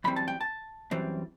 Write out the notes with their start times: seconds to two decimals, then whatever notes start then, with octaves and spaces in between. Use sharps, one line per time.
0.04 F#2 E3 G3 C4 B5
0.16 A5
0.28 G5
0.41 A5
0.91 F#2 E3 G3 C4